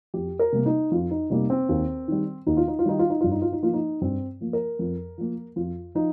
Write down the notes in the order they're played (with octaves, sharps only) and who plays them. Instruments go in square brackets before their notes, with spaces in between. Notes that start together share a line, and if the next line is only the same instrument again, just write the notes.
[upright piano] F2 G4
A#4
C3 G3 A#3
D#4
F2 F4
D#4
C3 G3 A#3 D#4
C4
D#2
D#3 G3
D#2 D#4
F4
D#4
F4
D#3 G3 D#4
F4
D#4
G2 F4
D#4
F4
D#4
F3 A#3 F4
D#4
G2 C4
F3 A#3
A#4
F2
F3 A#3
F2 F4
F3 D#4